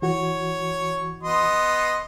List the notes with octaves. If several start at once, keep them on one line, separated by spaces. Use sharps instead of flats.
E3 F#4 C#5
B3 D#5 C6